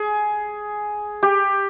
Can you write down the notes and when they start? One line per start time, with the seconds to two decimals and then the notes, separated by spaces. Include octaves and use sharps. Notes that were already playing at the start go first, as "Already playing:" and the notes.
Already playing: G#4
1.23 G4